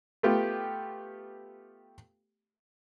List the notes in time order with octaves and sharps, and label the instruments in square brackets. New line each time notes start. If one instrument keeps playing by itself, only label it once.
[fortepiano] A3 B3 F4 G4 G5